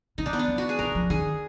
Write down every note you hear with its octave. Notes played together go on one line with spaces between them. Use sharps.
D3 D#4
D4
B3
D4
D3
F#4
G#4
D#3 A#4
F3
D#3 G#4